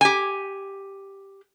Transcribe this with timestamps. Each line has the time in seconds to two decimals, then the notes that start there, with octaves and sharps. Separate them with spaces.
0.01 G4 G#5